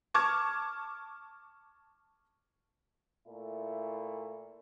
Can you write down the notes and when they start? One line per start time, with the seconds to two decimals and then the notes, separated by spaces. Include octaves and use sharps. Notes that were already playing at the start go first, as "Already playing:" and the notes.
0.14 A5 C#6 D6 F6 G#6
3.27 A#2 A3 E4